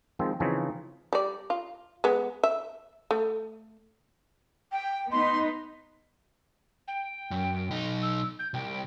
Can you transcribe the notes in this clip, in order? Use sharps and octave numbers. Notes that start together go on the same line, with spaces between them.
D#3 F3 G#3 C4
C#3 E3 F3 C4 C#4 D#4
G3 D5
F4
G#3 B3
E5
A3
G5
B3 D#4 B4 C6
G5
F#2
B1 D#4
E6
G6
C2 G5